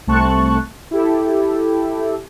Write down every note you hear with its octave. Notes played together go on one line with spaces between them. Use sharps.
C2 A3 C4 A5 C#6 F#6
E4 G4 A4